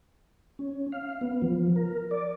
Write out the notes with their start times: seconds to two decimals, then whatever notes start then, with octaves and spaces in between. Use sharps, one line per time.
0.59 C#4
0.92 F5
1.21 B3
1.42 F3
1.76 A#4
2.11 D5